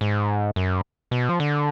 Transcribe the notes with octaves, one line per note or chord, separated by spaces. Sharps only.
G#2
F#2
B2
F3
D3